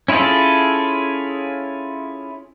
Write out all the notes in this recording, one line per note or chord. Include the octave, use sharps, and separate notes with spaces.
C#4 E4 F4 G#4 A4